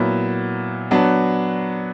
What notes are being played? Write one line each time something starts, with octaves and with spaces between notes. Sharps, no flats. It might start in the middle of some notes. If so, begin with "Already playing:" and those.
Already playing: A#2 F#3 B3 E4
F#3 B3 D4